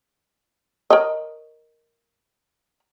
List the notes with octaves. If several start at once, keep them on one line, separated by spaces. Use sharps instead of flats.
A#4 C#5 D#5